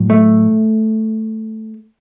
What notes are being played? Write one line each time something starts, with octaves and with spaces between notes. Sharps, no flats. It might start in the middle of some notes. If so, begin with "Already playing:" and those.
Already playing: A2 F#3
A3